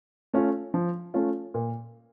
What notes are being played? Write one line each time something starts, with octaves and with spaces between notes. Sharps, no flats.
A3 C#4 F4
F3
A3 C#4 F4
A#2